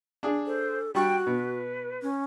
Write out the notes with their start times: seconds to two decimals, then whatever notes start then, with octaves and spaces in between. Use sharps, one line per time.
0.23 D4 G#4
0.46 A4 C5
0.95 G3 F#4 G5 C#6
1.27 B2 B4
2.02 C#4